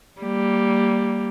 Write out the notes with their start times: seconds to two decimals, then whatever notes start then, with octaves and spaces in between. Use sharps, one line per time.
0.21 G3 A#3